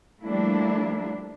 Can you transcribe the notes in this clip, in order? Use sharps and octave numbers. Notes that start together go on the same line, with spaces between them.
F3 G3 A3 A#3 D4 E4